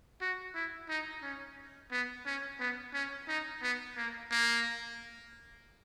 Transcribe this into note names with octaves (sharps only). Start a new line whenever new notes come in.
F#4
E4
D#4
C#4
B3
C#4
B3
C#4
D#4
B3
A#3
A#3